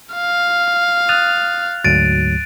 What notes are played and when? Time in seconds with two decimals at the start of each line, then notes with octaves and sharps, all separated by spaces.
0.14 F5
1.09 D#6 F#6 A6 F7
1.84 D2 G#2 F#3 A6 D7 D#7